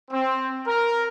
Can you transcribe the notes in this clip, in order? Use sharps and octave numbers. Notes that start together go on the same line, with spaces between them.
C4
A#4